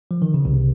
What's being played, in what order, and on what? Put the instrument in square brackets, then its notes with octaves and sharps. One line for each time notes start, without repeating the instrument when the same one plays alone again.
[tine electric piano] F3
D#3
C#3
C2 C3